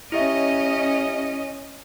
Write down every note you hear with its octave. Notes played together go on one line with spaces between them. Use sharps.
C#4 E4 G4 D#5 E5